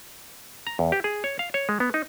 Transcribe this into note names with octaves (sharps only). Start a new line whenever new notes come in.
A#5
E2
G4
G#4
C#5
F5
C#5
G#3
B3
D#4